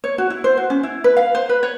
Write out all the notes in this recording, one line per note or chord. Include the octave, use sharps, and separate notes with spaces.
C#5
F#4
E4
C5
F#4
C#4
E4
B4
F5
C5
B4
C#5